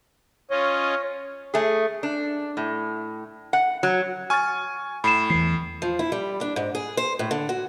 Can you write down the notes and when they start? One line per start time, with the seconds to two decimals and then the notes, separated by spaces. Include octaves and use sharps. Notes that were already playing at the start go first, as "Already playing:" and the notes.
0.51 C#4 F4 C#5 D#5
1.54 A3 G#4
2.03 D4
2.57 A2
3.53 F#5
3.83 F#3
4.30 G#5 C#6 F6 A6
5.04 A2 B5 C7 E7
5.30 E2 E3 C7
5.82 F3
5.99 E4
6.12 G3
6.41 D4
6.56 G#2
6.75 G#4
6.97 C5
7.19 A2
7.31 D3
7.49 F#4